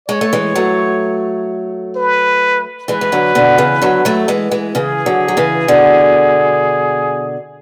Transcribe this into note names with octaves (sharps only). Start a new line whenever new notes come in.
G#3 C#5
A3
E3 G#3
F#3 A3
B4
E3 G#3 B4
E3
D3 F#3
B2 D3
C#3 E3
D3 F#3
F#3 A3
E3 G#3
E3 G#3
C#3 E3 G#4
D3 F#3
F#3
C#3 E3
B2 D3